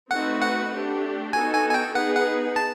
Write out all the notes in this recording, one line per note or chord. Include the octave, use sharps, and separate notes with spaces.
A3 C4 D#4 F#4 B4 F#5
F#5
A3 D4 G4
B3 D#4 F#4 A4 G#5
G#5
G#5
G5
B3 D#4 G#4 B4 F#5
F#5
A5